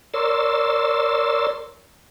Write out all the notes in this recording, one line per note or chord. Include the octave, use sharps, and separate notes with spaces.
A#4 C#5 D5 C6 E6 A6